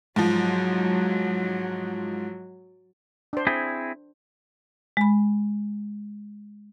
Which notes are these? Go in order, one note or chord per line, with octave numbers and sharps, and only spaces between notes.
G#2 F3 F#3
D4 C5
C4 E4 G#4
G#3 B5